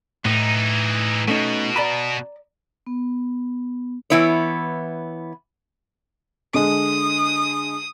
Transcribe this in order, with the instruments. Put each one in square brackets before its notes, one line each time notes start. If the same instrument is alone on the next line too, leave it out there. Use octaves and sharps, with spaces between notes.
[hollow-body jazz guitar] A2 [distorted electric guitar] E3 D#4
[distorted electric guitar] B2 [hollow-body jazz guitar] A3 C#4 D#4
[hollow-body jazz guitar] D5 A#5 B5
[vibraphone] B3
[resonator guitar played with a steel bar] E3 B3 E4 B4 C#5
[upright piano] D3 G#3 [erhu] D#6